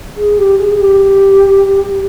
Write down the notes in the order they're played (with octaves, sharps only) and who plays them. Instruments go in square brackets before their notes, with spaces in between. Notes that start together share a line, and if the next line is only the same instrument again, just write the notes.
[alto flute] G#4
G4
G#4
G#4
G4